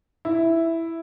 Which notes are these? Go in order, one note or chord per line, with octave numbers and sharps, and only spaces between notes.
E4